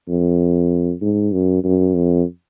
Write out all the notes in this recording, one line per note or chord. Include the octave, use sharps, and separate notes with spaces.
F2
G#2
F#2
F#2
F2